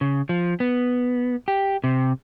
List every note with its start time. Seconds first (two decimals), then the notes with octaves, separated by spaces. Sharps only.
0.01 C#3
0.29 F3
0.60 B3
1.48 G4
1.84 C3